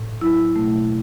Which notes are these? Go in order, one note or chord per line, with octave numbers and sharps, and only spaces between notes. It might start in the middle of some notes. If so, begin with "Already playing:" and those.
Already playing: A2
F#3 E4
B2 A3